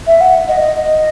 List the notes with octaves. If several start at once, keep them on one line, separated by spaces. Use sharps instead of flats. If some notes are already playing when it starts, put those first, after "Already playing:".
E5
F#5
D#5
D#5